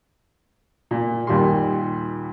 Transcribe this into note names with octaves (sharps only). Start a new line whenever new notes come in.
A#2
D#2 A#2 G3 C6